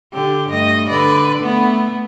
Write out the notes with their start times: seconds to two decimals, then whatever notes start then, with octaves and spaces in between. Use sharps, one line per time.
0.14 D3 G4
0.50 G2 A3 D#5
0.89 D3 B4 D5
1.42 A3 B3